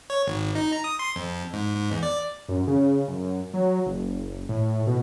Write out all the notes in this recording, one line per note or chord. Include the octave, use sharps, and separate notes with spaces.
C#5
G#1
D#4
A#5
D#6
C6
F2
G#2
G#2
E2
D5
F#2
C#3
F#2
F#3
F#1
A2
B2